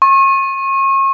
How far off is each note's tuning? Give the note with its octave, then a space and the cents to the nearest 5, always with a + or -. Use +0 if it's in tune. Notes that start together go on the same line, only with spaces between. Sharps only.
C#6 -35